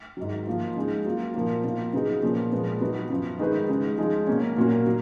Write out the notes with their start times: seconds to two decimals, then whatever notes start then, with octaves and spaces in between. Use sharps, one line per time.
0.17 G#2 D#3 F#3
0.47 F3 A#3 F4
0.76 C#3 G#3 D#4
1.05 F#3 A#3 F4
1.34 A#2 F3 A#3 F4 A#4
1.64 B2 A#3 F4
1.93 C#3 F#3 B3 D#4 G#4
2.23 A#2 F3 A#3 C#4
2.52 A#2 F3 G#3 B3
2.81 F#3 B3 D#4 F#4
3.10 F#2 F3 B3
3.39 D#3 G#3 D#4 G#4 B4
3.69 C#3 G#3 D#4
3.98 F3 G#3 D#4
4.27 B2 A#3 C#4
4.57 A#2 F#3 A#3 C#4 F#4
4.86 F#3